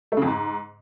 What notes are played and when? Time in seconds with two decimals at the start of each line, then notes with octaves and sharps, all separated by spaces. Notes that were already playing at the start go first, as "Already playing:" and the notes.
0.12 A3
0.17 C#3
0.22 F2
0.27 G#2